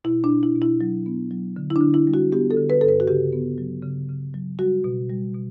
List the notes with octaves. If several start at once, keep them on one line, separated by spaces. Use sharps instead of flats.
B2 E4
D4
B2
E4
B2
E4
F#3
B3
F#3
D3
E4
D4
D3
E4
G3
F#4
B3 G4
A4
D3
B4
G2 A4
B4
F#4
C#3 G4
B3
F#3
C#3
C#3
F#3
G3 F#4
B2
G3
B2